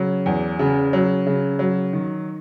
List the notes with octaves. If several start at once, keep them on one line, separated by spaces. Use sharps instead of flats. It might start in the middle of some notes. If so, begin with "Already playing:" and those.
Already playing: C#3 F#3
E2
C#3
F#3
C#3
F#3
D#3